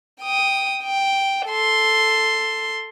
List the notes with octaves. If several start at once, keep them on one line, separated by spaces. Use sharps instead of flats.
G5 D#6
G5
A4 C6